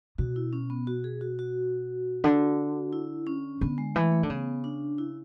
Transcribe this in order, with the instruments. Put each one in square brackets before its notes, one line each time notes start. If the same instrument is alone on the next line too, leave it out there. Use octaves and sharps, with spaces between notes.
[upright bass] B2 [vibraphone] F#4
[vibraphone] E4
C#4
B3
F#4
G#4
F#4
F#4
[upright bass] D3
[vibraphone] E4
C#4
[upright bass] D3 [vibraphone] B3
[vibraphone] G#3
[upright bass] E3 [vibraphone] A3
[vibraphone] A3
[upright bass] D3
[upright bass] C#3 [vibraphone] B3
[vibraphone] D4
E4